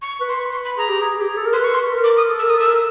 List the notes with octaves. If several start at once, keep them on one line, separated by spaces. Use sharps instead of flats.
C#6
B4
C6
C#6
C6
B5
G#4 A#5
G4
G#4
G4
G#4
A4
A#4
B4 C6
C#6
C6
A#4
D6
D#6
A4
A#4 E6
A4 D#6
E6
A#4